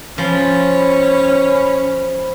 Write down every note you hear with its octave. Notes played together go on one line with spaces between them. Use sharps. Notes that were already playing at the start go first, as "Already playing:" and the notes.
F3 C#4 B5